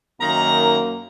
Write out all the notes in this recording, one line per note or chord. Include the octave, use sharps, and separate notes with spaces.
F#2 D#3 A#3 A#5